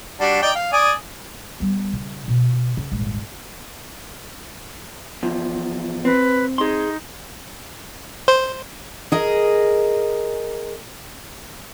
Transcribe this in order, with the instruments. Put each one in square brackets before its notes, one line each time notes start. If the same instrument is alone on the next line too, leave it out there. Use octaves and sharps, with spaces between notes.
[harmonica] G3 D4 F#4
D#4 D5 G5
F5
D5 G#5 D#6
[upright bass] G3 B3
C#3
B2
C#3
D#1 G#1
[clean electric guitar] E2 F3
[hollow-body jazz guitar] C4 [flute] B4
[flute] D#4 [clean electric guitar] G#4 C6
[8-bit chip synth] C5
[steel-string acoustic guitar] G#4 A#4 D#5